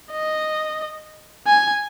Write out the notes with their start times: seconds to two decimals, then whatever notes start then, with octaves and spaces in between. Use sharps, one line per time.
0.12 D#5
1.47 G#5